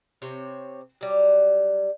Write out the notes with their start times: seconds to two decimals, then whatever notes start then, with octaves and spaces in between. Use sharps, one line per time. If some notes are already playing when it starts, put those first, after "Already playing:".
0.22 C3 C4 C#5
1.01 F#3 G3